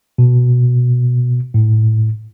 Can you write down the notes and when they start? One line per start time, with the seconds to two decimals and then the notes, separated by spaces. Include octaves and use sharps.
0.18 B2
1.54 A2